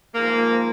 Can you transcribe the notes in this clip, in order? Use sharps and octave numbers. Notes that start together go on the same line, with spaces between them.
G#2 F3 A#3